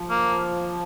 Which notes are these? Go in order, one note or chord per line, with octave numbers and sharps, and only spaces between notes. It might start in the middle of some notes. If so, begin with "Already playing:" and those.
Already playing: F3
A#3